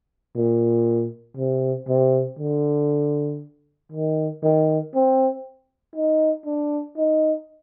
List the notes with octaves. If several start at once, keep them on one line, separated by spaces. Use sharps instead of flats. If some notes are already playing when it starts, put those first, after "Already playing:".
A#2
C3
C3
D3
D#3
D#3
C4
D#4
D4
D#4